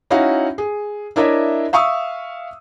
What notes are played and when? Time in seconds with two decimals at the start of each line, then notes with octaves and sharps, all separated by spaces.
0.10 C#4 D#4 E4 F#4 F5 F#5
0.58 G#4
1.16 D4 E4 A#4 C#5 D#5 E5
1.73 E5 F5 C#6 D#6 E6